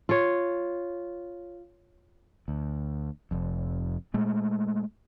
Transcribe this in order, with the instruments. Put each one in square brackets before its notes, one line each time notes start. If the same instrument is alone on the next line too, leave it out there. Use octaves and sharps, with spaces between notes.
[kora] F4 C#5
[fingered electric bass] D2
F1 F2
A#2 G#3 A3